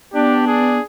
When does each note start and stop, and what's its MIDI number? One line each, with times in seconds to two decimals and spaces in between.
0.14 0.78 59
0.14 0.79 62
0.14 0.47 67
0.47 0.85 68